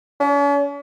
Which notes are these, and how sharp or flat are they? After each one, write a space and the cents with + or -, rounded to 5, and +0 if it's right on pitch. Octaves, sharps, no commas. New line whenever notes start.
C#4 +45